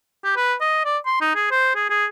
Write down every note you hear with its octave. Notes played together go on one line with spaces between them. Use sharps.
G4
B4
D#5
D5
C6
D#4
G#4
C5
G#4
G#4